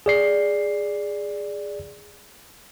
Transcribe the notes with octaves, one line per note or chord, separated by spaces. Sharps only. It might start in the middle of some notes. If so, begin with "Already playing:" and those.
G#4 D5 C7